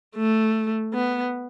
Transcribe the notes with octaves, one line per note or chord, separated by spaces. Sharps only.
A3
B3